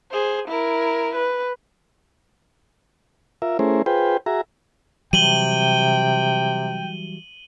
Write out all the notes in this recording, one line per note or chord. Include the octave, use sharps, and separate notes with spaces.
G#4 C5
E4 A#4
B4
F4 A#4 E5
A3 C#4 E4 G#4 A#4 C5
F4 G#4 B4 C5 G5
F#4 G#4 E5 A#5
C3 E3 F#3 G3 G5 D#7 F#7 G7